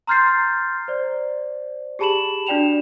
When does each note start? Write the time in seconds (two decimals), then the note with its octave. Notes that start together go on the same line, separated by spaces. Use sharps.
0.07 A#5 C6 F6 G6 A6 C7
0.88 C5 D5
1.99 G4 G#4 A5 B5 E7 F#7
2.47 D4 F#4 D5 G5 E7 F7